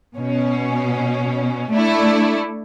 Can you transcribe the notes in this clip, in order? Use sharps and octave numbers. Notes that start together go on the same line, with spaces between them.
B2 C#4
A3 D4 E4